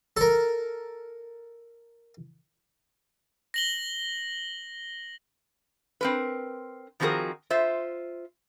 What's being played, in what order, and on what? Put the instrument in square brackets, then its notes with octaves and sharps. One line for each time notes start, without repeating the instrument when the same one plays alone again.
[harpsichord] A4 A#4
[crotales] A#6 F#7 G7
[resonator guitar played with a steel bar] C4 A#4 B4
D#3 F3 C4 F#4 G#4 A#4
F4 C5 E5